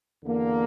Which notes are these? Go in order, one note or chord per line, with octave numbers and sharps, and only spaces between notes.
E2 D3 A#3